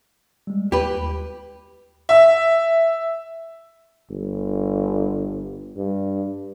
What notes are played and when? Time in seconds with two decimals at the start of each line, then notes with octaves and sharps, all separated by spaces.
0.47 G3 G#3
0.72 D#2 G4 B4
2.09 E5
4.10 G1
5.77 G2